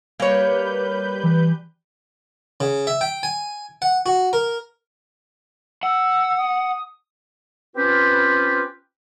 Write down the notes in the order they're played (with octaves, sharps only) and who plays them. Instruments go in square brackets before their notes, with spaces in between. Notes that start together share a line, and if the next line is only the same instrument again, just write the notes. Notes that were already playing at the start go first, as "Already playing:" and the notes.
[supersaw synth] G3 B4 G6 [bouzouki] A#3 C#5
[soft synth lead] E3
[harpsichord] C#3
E5
G5
G#5
F#5
F#4
A#4
[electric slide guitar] F#5 [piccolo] E6
[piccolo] D#6
[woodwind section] C4 C#4 F4 G4 B4